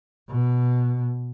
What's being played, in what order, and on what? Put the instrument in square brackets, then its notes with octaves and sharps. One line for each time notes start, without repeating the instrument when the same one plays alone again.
[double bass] B2